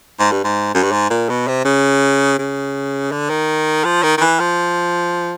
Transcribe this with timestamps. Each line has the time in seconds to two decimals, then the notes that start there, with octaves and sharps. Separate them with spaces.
0.20 G#2
0.32 G2
0.45 G#2
0.74 F#2
0.83 G2
0.92 G#2
1.10 A#2
1.29 B2
1.48 C3
1.65 C#3
2.39 C#3
3.12 D3
3.30 D#3
3.85 F3
4.03 D#3
4.18 D#3
4.21 E3
4.40 F3